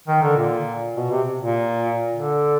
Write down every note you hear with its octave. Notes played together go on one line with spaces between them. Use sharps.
D#3
D3
A#2
B2
C3
A#2
D3